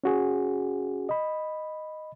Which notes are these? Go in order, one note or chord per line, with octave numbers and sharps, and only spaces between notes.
C#4 F#4 G#4
D#5 B5